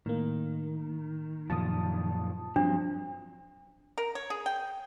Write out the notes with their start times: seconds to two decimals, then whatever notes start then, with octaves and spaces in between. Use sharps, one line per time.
0.06 A2 D#3 A#3
1.50 F#2 A#2 F3 A5 D#6
2.56 G2 F3 F#3 C4 D4
3.98 A#4
4.15 C#5
4.30 G#4
4.46 G5